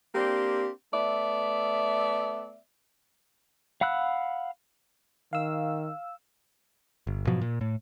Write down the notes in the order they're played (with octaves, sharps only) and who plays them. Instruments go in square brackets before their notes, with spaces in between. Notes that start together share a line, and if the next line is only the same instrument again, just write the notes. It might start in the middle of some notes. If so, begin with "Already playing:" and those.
[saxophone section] A#3 C4 D4 G4
A3 B3 D5 E5
[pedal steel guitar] F5 F#5 B5 E6 F#6
[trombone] D#3 [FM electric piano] F5 E6
[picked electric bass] G1
G#2 B2 F3 F#3
A#2
A2